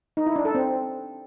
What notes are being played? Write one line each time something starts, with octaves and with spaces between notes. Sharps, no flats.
D#4
E4
D4
A4
C4